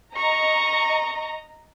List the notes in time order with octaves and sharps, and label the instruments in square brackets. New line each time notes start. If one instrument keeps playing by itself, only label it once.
[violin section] D#5 A#5 [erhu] C#6